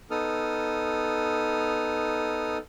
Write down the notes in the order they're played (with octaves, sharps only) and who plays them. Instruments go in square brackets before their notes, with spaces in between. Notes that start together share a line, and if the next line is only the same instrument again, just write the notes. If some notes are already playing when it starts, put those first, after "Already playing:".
[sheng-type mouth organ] B3 D#4 A4 D#6 F6